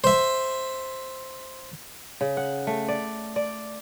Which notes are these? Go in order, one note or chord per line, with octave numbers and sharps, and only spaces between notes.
C5 E5
C#3
F#5
A3
D5
D5